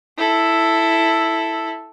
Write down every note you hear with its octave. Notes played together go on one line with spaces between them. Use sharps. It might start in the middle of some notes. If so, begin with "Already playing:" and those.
E4 A4